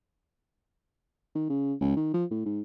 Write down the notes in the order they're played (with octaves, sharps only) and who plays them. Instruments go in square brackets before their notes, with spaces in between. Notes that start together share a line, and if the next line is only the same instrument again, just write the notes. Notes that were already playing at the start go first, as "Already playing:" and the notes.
[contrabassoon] D#3
C#3
C#2
D#3
F3
A2
G#2